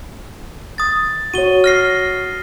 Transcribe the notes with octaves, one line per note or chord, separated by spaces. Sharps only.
D#6 A6
F#4 C#5 D#7 G7
F6 A#6 C7